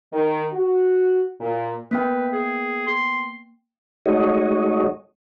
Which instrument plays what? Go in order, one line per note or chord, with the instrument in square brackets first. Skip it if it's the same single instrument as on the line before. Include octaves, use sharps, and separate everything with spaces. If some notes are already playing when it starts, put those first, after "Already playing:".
[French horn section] D#3
F#4
A#2
[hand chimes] A#3 B3 G5 [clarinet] B4
[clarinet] G#4
C6
[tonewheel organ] G#3 A3 D#4 F#4 C#5 D#5